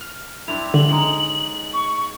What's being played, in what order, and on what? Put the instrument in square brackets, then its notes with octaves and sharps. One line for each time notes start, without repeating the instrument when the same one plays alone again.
[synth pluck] F6
[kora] C4 D4 E4 [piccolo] F7
[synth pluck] D3 [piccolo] F#7
[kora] G#3 C#4 D#4
[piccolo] C#6